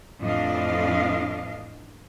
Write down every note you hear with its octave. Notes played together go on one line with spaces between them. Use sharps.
F2 A2 E3 D4 D#5 F5